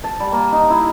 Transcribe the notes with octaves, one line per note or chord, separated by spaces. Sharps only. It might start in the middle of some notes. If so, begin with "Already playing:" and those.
A5
G3
A#3
D#4
E4